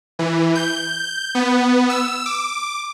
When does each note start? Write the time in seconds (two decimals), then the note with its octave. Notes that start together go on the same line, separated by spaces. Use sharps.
0.19 E3
0.55 G6
1.35 B3
1.89 E6
2.26 D6